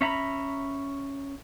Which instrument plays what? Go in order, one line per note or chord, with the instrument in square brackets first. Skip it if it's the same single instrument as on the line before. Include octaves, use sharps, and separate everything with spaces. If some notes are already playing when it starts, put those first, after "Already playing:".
[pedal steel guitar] C#4 E5 A#5 B5